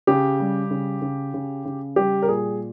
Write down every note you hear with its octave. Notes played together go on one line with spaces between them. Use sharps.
C#3 G4
G3
C#3
C#3
C#3
C#3
G3 G4
A#4
A#2 G#4